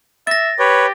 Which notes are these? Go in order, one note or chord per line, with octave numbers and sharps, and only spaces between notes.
E5 A6 A#6
G4 B4 C#5